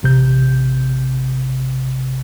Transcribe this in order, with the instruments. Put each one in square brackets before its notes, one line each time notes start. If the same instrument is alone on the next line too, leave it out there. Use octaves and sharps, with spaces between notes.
[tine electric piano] A1 C3 G6